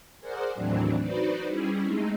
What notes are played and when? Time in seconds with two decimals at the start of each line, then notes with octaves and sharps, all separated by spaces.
0.19 G#4 A#4 C5 D5 F#5
0.54 D#2 A2 E3 F#3 C4 D4
1.01 D#4 F#4 B4 C5 D5
1.47 G3 C#4 E4 G#4
1.84 G#3 A3 C4 D#4